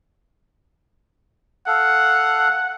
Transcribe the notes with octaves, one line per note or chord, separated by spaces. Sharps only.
A4 F5 F#5